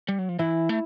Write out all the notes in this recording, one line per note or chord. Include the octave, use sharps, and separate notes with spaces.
G3
F#3
F3
E3 E4
A3